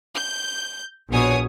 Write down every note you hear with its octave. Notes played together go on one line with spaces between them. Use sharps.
G6
A#1 B2 C#5 G#5 D#6